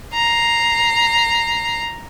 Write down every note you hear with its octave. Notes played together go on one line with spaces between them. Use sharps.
A#5 C7